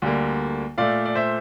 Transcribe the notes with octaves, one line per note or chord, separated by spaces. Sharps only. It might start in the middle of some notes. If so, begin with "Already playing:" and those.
D2 D3 G3 A#3
A#2 A3 D5 F5
D5
C5 E5